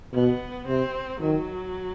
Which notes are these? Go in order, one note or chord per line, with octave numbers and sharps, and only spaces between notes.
B2 B3
C3 C4
D#3 F#3